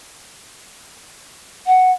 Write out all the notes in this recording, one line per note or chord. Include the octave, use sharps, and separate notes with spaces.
F#5